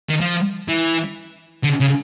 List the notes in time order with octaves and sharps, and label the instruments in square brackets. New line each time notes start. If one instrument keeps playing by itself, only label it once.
[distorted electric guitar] D#3
F3
E3
D3
C#3